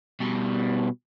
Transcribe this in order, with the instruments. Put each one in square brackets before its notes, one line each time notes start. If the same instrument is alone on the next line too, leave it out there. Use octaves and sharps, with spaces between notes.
[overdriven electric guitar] B2 G3